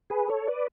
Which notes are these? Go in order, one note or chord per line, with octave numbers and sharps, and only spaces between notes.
G#4 B4
A4 C#5
B4 D5